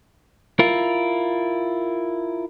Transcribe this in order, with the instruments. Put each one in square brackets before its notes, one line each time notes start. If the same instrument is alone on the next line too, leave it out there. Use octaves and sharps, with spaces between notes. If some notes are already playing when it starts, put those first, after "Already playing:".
[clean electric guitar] E4 F4 A#4